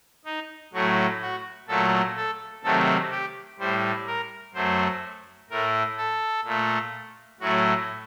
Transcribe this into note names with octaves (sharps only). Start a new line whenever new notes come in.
D#4
A2 F#3 A3 F#4
F#4
A#2 F#3 A3 A4
A4
C3 D#3 F#3 A3 A4
G4
A2 G3 C5
A#4
F#2 F#3 A3 C5
A2 A3 A#4
A4
A#2 A3
A2 F#3 A3 F#4